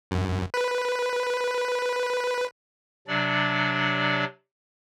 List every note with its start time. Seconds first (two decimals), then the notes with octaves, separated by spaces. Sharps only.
0.11 F#2
0.54 B4
3.07 C3 F#3 D4 D5